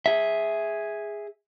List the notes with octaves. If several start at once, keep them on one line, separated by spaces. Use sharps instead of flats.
G#4 E5